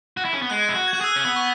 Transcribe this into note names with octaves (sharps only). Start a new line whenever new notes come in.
F#4
E4
C#4
B3
G#3 F#6
E4
F#4
G#6
F#4 F#6
G#4 E6
C#4 F#6
B3 E6
C#6